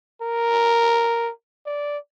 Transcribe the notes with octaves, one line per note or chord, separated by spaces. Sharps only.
A#4
D5